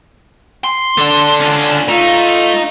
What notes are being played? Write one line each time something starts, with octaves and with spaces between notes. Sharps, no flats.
C6
D3 D4 A4
C#4 F4
A3 D#4 F4